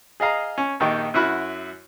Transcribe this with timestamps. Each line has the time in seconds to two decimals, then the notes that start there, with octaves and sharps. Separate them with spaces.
0.20 G#4 D#5 F5 A#5
0.58 C#4
0.80 A#1 D#3 D#4 G4 C#6
1.14 F#2 E4 F#4 B5 F6